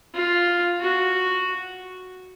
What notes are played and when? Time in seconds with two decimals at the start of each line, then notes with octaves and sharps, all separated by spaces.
0.14 F4
0.80 F#4